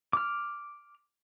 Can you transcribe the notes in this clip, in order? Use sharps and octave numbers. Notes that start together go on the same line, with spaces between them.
D6 F6